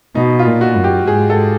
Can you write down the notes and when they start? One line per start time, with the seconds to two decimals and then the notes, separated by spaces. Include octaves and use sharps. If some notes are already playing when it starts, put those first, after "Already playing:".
0.15 B2 D#4
0.39 F4
0.47 A#2
0.61 F#4
0.76 F#2
0.84 G4
1.07 G#2 G#4
1.30 A4